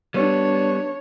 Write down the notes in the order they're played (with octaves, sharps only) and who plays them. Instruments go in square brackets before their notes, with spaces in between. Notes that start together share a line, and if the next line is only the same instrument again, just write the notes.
[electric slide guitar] G3 B3 [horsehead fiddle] D4 C#5